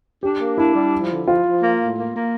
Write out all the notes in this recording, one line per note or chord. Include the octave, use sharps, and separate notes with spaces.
D4 G4
A#3
D4 E4
G3
F3
D3
F3 F4
F3
A#3
A2
A#3
A#3